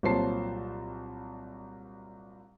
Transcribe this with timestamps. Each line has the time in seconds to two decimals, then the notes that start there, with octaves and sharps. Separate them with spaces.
0.03 C2 A#2 F#3 C5 A5 C7